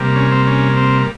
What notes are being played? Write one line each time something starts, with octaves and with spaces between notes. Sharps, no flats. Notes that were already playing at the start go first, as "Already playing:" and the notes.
Already playing: C3 G3 A#3
C#4
C4
C#4
C4